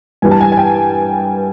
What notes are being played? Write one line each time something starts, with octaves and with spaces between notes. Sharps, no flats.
G2 E3 G3 G#5
A5
G#5
G#5
G5